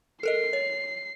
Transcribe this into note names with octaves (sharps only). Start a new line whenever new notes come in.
A4 A#4 D#5 C7
C#5